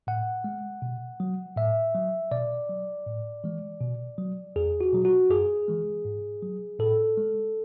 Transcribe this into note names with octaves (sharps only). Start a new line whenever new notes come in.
A2 F#5
G#3
B2
F#3
A2 E5
F#3
B2 D5
F#3
A2
E3 G#3
B2
F#3
E2 G#4
F#4
B2 F#3
F#4
F#2 G#4
E3 G#3
G#2
F#3
A2 A4
G#3